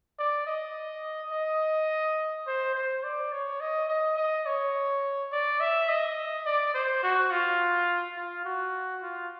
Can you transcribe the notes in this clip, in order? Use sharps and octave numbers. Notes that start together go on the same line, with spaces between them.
D5
D#5
D#5
C5
C5
D5
C#5
D#5
D#5
D#5
C#5
D5
E5
D#5
D5
C5
F#4
F4
F4
F#4
F4